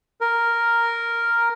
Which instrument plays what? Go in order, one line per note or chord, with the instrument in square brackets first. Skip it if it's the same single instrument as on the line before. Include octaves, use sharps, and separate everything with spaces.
[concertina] A#4